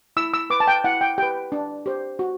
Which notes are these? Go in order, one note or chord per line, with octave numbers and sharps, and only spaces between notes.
E4 E6
E6
B4 D6
A5
G5
E4 F#5
G5
G4 B4 G5
D4
G4 C5
F#4